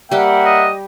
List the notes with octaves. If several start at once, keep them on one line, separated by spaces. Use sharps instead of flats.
G3 A#3 G4 E5 F#5
D#5